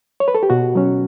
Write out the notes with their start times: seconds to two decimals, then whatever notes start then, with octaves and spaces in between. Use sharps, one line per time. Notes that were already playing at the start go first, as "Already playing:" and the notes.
0.20 C#5
0.28 B4
0.35 A4
0.43 G4
0.50 B2 F#4
0.75 F#3 C#4